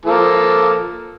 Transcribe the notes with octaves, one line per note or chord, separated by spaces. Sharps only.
F3 A#3 A4